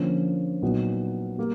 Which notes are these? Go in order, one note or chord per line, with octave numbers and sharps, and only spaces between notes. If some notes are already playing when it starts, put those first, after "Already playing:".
Already playing: D3 F3 A#3 C#4
A#2 F#3 B3 D#4
G3 A#3